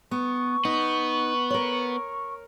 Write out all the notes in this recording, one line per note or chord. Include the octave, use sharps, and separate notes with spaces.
B3 C#6
B3 D#4
A#4 C#5